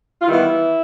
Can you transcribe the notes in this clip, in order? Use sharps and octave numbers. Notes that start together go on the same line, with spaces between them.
F4
D#3 E3 G3 B3 E4